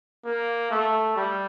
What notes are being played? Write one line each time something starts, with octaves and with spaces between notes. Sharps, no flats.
A#3
A3
G3